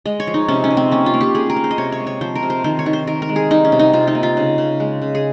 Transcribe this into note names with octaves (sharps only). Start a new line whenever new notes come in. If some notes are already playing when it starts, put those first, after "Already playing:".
G#3 D#5
C#5
F3
D#4
C3 C#4
C#4
C3
C4
A#3 C#4
F4
A#3
G4
A#3 G#4
A#4
A#3
C5
D#5
C3 C#5
C#5
G#3
C#5
F3 C5
A#4
C3
C5
D#3 C5
C#5
D#3
C5
D#3 A#4
A#4
G#3
G#4
G3 D#4
C#4
C3
D#4
C3 F4
D#4
A#3
F4
C#3
C#3
G#3
C#3
G#4